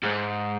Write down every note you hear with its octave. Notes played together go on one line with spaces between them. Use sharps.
G#2